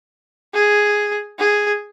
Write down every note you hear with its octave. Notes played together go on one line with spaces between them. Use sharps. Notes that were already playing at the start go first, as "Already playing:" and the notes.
G#4
G#4